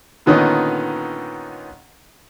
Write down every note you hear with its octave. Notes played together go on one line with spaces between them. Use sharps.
A#2 D3 D#3 B3 C#4 D#4